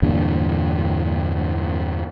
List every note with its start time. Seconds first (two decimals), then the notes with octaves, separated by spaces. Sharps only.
0.02 E2 G2 A#2 D3